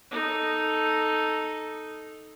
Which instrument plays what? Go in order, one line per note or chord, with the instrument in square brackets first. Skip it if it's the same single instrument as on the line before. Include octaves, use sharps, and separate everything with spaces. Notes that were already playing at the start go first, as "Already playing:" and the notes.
[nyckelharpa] D#4 A4